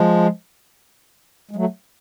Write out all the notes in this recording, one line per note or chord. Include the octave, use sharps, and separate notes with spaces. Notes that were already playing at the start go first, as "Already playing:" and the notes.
Already playing: F3 G#3
G#3
F#3 A3